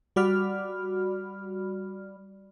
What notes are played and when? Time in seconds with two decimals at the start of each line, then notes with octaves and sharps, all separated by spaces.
0.16 G3 F#4 D5 B5 F6